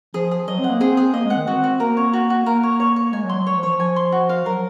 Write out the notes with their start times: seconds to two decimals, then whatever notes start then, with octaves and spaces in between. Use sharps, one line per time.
0.14 F3 G#4
0.31 G#4
0.47 F#3 D#5
0.59 C4 F#5
0.70 A#3
0.81 C4 G#4
0.97 G#4
1.14 A#3 D#5
1.25 G#3
1.30 F#5
1.37 D#3
1.48 C4 F#4
1.64 F#4
1.80 A#3 A#4
1.97 C#5
2.13 F#4
2.30 F#4
2.46 A#3 A#4
2.63 C#5
2.80 C#5
2.96 C#5
3.13 G#3 G#5
3.24 F#3
3.29 C6
3.35 F#3
3.46 F#3 C#5
3.57 F3
3.63 C#5
3.69 F3
3.80 G#5
3.96 C6
4.12 F#4
4.29 F5
4.45 F#3 A#4